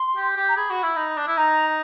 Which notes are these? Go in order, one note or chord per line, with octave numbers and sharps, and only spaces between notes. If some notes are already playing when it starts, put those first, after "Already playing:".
Already playing: C6
G4
G4
A#5
G#4 B5
F#4
E4
D#4
D4
E4
D#4 A#5